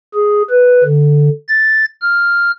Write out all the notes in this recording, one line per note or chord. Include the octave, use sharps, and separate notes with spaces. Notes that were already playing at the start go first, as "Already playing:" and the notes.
G#4
B4
D3
A6
F6